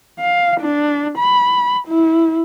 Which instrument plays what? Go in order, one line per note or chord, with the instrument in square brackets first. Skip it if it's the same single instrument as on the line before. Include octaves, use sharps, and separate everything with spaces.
[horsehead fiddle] F5
D4
B5
E4